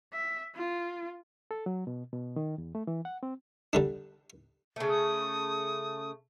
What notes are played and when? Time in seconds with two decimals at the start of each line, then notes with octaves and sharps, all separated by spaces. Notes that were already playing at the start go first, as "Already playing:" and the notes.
0.13 E5
0.55 F4
1.51 A4
1.66 F#3
1.87 B2
2.13 B2
2.36 D#3
2.58 E2
2.75 A3
2.87 E3
3.05 F#5
3.23 C4
3.73 D3 G3 D4
4.76 C#3 A3
4.89 D#6